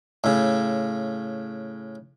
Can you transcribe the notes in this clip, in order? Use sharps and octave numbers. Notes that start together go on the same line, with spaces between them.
A2 C#3